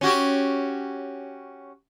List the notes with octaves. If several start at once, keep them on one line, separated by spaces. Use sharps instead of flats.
C#4 F#4 G4